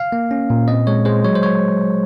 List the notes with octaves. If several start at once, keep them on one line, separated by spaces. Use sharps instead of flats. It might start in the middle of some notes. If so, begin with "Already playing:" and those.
Already playing: F5
A#3
C#4
A#2
C4 D#5
G#3 C#5
G#3 C5
F#3 C#5
C5
C#5